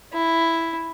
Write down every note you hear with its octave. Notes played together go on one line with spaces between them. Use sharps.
E4